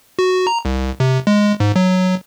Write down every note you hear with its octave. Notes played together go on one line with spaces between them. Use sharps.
F#4
A#5
C2
C3
G#3
G#2
F#3